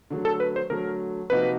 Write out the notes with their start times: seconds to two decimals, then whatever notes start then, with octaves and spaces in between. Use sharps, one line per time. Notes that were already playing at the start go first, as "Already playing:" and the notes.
0.10 D3 F#3 A3
0.25 A4
0.40 B4
0.56 C5
0.70 D3 F#3 A3 A#4
1.30 C3 F3 A#3 D#4 F#4 B4